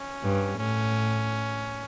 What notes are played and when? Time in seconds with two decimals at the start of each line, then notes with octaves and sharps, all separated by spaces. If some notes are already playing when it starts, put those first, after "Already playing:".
Already playing: C#4
0.23 G2
0.59 A2 C#4